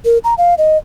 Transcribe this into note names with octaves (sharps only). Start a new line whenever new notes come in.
A#4
A#5
F5
D#5